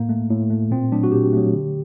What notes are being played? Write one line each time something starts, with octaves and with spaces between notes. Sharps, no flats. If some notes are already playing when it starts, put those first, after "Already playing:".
Already playing: A2 A#3
A3
A2
A3
A#2 C4
F#3 A3 D4
F#4
A#2 G4
F#3 A3
D3